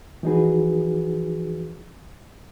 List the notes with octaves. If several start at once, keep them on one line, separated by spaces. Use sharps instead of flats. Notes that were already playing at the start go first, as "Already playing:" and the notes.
E3 F3 D#4 F#4 G#4 B4